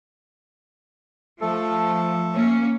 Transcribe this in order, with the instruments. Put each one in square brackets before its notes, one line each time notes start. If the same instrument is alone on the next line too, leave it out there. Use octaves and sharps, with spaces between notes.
[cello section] F3 [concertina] A3 A4
[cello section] A#3 C#4